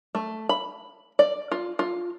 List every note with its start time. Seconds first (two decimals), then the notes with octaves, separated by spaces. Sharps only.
0.15 A3
0.49 B5
1.19 D5
1.52 F4
1.79 F4